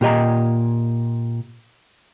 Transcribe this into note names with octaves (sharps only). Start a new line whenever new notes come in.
A#2 G4 D#5 A#5